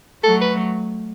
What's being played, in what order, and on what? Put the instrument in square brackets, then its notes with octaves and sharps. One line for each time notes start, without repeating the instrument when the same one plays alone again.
[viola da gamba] F#3 A3 [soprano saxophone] A4
[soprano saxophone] B4